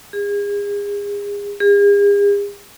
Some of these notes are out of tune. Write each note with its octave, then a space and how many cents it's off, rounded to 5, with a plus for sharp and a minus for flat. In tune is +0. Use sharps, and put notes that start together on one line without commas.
G#4 -35
G#4 -45